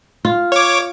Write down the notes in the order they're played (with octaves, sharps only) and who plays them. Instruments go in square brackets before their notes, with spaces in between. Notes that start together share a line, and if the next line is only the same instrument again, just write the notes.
[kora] F4
[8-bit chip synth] C#5 D6